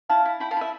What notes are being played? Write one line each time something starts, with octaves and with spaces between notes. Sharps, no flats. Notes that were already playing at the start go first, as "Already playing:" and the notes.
E4 F5 A5
E4
E4 G5 B5
F5 A5
E4 E5